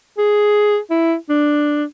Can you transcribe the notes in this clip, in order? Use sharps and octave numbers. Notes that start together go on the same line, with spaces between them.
G#4
E4
D4